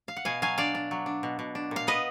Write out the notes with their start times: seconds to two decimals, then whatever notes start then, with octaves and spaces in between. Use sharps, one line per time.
0.08 F5
0.16 F#5
0.25 B2 F5 G#5
0.42 F#3 F5 G#5
0.58 D4 D5 F5
0.75 D4
0.91 F#3
1.06 D4
1.23 B2
1.39 B2
1.55 D4
1.71 A#2 F5
1.87 B3 B4 D#5